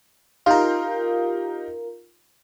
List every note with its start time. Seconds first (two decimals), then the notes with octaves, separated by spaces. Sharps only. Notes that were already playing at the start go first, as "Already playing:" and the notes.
0.46 D#4 F4 G4 A#4 F5